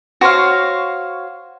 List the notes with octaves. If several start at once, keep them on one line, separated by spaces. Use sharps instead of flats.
F#4 C5 C#5 F5